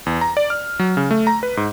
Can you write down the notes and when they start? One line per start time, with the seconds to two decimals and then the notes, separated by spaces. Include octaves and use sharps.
0.06 E2
0.21 A#5
0.37 D5
0.50 F6
0.79 F#3
0.97 C#3
1.11 A3
1.27 A#5
1.43 B4
1.57 G#2